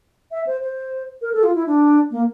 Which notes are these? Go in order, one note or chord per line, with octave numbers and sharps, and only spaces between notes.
E5
C5
C5
A#4
A4
F4
E4
D4
A#3